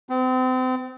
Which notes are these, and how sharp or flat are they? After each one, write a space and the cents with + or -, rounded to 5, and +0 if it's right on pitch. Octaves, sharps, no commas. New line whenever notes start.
C4 -35